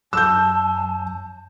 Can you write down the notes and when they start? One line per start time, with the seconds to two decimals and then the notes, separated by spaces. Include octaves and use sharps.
0.13 F#2 A5 E6 G6